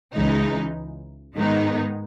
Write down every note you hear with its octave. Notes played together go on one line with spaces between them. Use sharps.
C#2 C#3 E3 G#3 D#4
G#2 D#3 G#3 B3 D#4